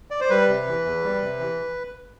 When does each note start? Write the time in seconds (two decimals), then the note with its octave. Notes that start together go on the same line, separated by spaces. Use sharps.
0.11 D5
0.21 C5
0.30 G3 B4
0.48 C3
0.67 E3
0.85 E2
1.04 G3
1.22 C3
1.40 E3